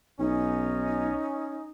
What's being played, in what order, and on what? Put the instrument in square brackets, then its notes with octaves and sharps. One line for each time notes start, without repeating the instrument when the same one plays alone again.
[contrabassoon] B1 [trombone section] C#4 [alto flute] D#4